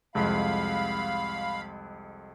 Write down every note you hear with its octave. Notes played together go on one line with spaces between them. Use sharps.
C2 F2 G#3 F5 B5